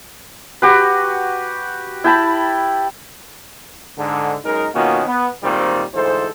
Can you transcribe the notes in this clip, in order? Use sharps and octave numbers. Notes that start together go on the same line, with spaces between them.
F#4 G4 B4
E4 G5 A5 B5
G#2 D3 A4
F#2 G#3 D#4 A#4
B2 D#3 A#3 C#4 F4 F#4
B3
G#1 A#2 D#3 G3 C4
D2 G#2 E3 A4 C5